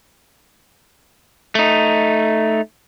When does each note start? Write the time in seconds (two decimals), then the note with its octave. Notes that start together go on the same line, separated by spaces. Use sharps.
1.55 A3 D#4